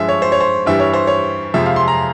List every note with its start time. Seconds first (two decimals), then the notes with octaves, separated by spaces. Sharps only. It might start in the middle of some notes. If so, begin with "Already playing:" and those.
Already playing: G2 F3 G#3 E5
0.09 C#5
0.22 C5
0.32 C#5
0.40 C5
0.66 G2 E3 G3 E5
0.80 C#5
0.93 C5
1.07 C#5
1.54 F2 C3 F3 G#3 E5
1.66 F5
1.76 C6
1.88 A#5